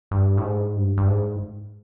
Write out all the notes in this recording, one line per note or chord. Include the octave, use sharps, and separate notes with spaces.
G2
A2
G#2
G2
G2
G#2